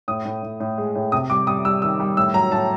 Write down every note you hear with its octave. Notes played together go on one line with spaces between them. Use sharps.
A2 D#6
A2
A2
A2
G#3
A2
C3 D#6
G3 D6
G3 D#6
G3 E6
D#3 E6
G3
A2 E6
F#3 A#5
A2 A5